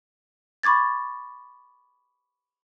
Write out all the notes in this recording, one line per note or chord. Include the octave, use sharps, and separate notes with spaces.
B5 C#6 D6 G#6 A6